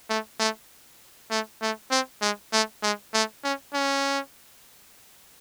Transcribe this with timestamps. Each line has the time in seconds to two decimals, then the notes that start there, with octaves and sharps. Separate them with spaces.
0.10 A3
0.40 A3
1.31 A3
1.62 A3
1.91 C4
2.22 G#3
2.53 A3
2.83 G#3
3.14 A3
3.44 C#4
3.74 C#4